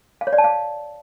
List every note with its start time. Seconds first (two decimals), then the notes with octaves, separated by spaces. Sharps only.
0.21 F5
0.27 C#5
0.33 D5
0.38 A5
0.44 F5